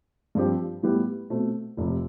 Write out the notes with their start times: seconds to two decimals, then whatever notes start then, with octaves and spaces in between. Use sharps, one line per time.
0.35 G2 F3 C4 G4
0.83 A2 G3 B3 E4 G4
1.30 B2 A3 C4
1.77 F1 F2 C3